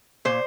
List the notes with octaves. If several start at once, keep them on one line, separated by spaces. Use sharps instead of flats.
A#2 C5